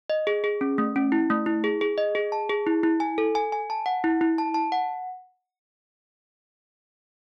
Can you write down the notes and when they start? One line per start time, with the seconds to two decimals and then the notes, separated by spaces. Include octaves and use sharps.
0.10 D#5
0.27 G#4
0.44 G#4
0.61 C#4
0.78 A3
0.96 C#4
1.12 E4
1.30 A3
1.46 E4
1.64 G#4
1.81 G#4
1.98 D#5
2.15 G#4
2.32 A5
2.50 G#4
2.67 E4
2.83 E4
3.00 G#5
3.18 A4
3.35 G#5
3.52 G#5
3.70 A5
3.86 F#5
4.04 E4
4.21 E4
4.38 A5
4.54 A5
4.72 F#5